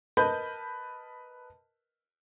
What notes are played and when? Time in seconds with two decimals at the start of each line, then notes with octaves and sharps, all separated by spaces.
0.17 A#4 B4 D#5 A5 B5 G6